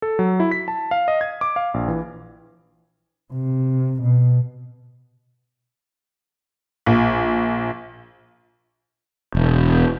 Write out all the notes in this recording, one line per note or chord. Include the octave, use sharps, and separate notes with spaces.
A4
F#3
E4
B6
A5
F5
D#5
G#6
D6
F5
A#1
E3
C3
B2
A#1
E1